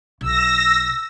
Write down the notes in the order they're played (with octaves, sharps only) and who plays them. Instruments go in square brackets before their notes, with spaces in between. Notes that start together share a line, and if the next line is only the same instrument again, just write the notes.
[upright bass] B1 [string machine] E6 A#6